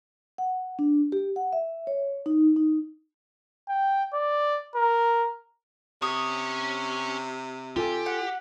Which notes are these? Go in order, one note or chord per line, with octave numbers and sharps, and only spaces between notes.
F#5
D4
G4
F#5
E5
C#5
D#4
D#4
G5
D5
A#4
C3 C#4 C#5 D#6
F4 G4 A4 G#5
F#5